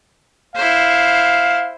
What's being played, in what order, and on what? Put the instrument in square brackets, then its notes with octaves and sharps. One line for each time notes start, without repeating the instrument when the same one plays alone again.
[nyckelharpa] E4 C5 [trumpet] F5